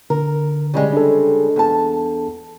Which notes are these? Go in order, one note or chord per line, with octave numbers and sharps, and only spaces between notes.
D3 A#4
C#3 G3 G#3
D4 A4
E2 A5